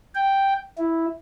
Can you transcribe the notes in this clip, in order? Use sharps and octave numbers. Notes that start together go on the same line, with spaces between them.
G5
E4